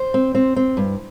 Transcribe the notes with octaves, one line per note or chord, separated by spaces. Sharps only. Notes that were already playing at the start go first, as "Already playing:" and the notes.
Already playing: C5
C4
C4
C4
G2